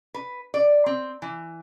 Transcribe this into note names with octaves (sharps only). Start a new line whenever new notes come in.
B4
D5
C4
E3